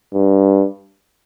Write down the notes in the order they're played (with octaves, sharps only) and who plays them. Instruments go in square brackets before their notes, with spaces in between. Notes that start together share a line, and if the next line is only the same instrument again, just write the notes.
[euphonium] G2